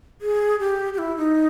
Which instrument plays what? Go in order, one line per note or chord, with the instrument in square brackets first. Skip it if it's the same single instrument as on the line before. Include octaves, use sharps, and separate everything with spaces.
[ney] G#4
G4
G4
E4
D#4